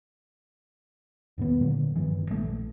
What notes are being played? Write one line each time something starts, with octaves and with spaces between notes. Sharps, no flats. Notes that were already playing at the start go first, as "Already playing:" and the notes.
E1 G#2 D#3 B3
A#2 D3 F#3
F#1 G2 D#3 E3
A#1 D#3 A3